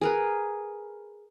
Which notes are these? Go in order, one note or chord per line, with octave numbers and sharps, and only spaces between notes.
G#4 A#4 B4